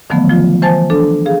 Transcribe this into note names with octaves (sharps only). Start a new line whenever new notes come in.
D3 D#3 F3 F#3 A3 B3
F3 F4
E3 C5 G#5 A5 A6
D4 A4
G#4 F5